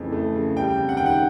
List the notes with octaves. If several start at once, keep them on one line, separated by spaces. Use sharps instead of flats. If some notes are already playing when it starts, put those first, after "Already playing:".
Already playing: F2 C#3 E3 A3
A3
C#3
G3 G5
C3
F#5
D#3 G5
F#5